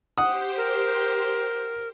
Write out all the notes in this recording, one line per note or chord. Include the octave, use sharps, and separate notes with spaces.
G4 C5 F#5 D#6
A#4